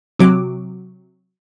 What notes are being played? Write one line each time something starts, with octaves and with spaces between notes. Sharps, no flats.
C3 F#3 D6